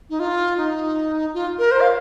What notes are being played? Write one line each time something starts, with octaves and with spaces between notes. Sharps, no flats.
D#4
F4
D#4
F4
A#4
C5
F5